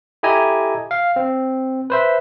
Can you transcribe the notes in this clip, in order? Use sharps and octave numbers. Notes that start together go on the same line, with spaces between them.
E4 G4 A4 D#5 G#5 A#5
F5
C4
B4 C5 E5